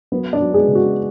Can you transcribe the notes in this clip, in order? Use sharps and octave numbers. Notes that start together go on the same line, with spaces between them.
F#3 B3 B4
D4 D5
F#3
G#3 G#4
C#3
F#4